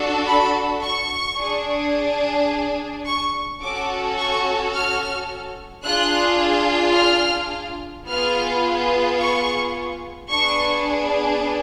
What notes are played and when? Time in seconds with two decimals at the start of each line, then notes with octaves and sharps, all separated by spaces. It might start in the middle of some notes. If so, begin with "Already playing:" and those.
Already playing: D4 F#4 A4
0.27 B5
0.83 C#6
1.38 D4 G#4
3.06 C#6
3.61 C#4 F#4 A4 D6
4.18 C#6
4.73 F6
5.84 D4 F4 G#4 F#6
6.95 F6
8.07 B3 F4 G#4 F6
9.19 C#6
10.30 B3 D4 G#4 C#6